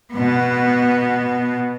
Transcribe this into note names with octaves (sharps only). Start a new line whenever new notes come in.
B2 B3